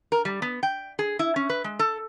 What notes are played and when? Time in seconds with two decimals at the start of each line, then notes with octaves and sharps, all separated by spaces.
0.12 A#4
0.25 G3
0.42 B3
0.63 G5
0.99 G#4
1.19 E4
1.36 C#4
1.50 B4
1.64 G#3
1.79 A4